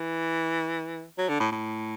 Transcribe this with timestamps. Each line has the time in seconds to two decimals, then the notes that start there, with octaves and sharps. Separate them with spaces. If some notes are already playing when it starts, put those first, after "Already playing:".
Already playing: E3
1.18 F#3
1.29 D3
1.40 A2
1.52 A2